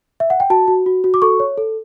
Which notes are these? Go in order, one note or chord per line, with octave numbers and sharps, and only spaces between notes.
E5
F#5
G5
F#4 A5
F#4
F#4
F#4
D6
A4 C#6
C#5
A4